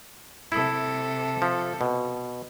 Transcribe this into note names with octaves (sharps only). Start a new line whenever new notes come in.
C3 E4 A4
F3
B2